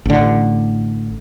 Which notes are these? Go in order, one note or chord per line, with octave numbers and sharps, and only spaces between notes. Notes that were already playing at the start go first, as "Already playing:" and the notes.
A1 D3